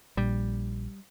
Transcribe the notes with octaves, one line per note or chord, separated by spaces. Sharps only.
A#1 G3